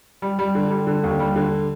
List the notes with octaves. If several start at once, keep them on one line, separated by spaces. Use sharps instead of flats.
G3
G3
D3
G3
D3
D#2
G3
D3